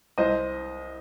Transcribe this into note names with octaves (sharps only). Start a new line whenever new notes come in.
C2 C5 D#5